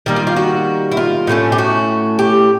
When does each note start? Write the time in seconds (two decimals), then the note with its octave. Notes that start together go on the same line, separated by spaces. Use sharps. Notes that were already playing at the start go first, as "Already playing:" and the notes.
0.06 D#3 G3 A#3 A#4
0.16 F4
0.27 F4
0.36 F#4
0.92 E4
0.97 F4
1.27 A2 F#3 A3 C#4
1.52 G4
1.58 F#4
2.19 G4